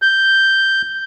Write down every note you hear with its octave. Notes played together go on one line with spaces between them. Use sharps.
G6